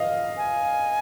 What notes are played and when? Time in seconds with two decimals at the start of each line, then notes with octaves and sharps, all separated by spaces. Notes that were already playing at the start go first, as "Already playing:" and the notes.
Already playing: D#5 F5
0.37 G#5